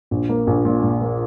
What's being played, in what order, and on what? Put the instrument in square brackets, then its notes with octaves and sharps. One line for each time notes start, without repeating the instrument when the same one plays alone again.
[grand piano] A#1
A#3
A#1
A#2
A#2
A#3